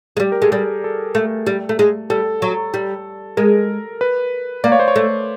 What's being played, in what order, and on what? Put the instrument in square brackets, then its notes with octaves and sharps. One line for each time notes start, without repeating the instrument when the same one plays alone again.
[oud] G#3
[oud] G3 [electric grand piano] G4
[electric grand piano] A#4
[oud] G#3 [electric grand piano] A4
[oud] G3 [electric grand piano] G#4
[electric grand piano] A4
[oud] A3
G3
A3
G#3
[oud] G3 [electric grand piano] A4
[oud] F#3
G3
[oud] G#3 [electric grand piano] A#4
[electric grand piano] B4
[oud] A#3 [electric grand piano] D5
[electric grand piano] C#5
C5
C#5
[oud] A3